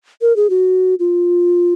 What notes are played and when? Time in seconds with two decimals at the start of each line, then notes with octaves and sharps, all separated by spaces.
0.21 A#4
0.36 G#4
0.50 F#4
0.99 F4